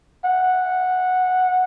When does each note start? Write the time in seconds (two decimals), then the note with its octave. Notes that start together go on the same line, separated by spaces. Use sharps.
0.24 F#5